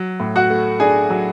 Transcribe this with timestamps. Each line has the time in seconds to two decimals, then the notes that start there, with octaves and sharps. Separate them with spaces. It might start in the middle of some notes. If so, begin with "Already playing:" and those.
Already playing: F#3
0.20 A2
0.36 F#4 F#5
0.50 A3
0.80 D4 G#4 G#5
1.10 F#3